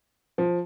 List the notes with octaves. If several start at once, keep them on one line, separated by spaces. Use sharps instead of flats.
F3